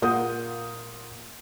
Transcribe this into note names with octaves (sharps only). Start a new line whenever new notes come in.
A#2 F4 A#4 F#5 D#6 G6